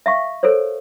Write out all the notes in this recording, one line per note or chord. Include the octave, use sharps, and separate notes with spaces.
E5 F5 C#6
A4 A#4 C5 C#5